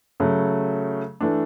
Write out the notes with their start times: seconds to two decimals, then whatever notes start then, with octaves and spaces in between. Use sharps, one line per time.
0.20 C#3 F#3 A3
1.21 E3 A3 D4